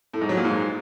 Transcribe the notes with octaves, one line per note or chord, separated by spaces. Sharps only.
A2
G#2
F#3
A#2
G#2